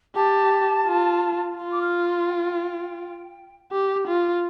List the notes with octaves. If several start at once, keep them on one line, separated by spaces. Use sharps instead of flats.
G4 A5
F4
F4 C6
D6
F6
C6
G5
G4
F4